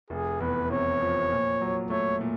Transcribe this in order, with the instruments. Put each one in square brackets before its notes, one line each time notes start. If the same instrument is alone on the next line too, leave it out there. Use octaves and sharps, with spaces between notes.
[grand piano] F1 [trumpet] G#4
[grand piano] E2 [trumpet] B4
[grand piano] C3 [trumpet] C#5
[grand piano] F3
A#2
F#3
[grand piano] A3 [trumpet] C#5
[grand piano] A#2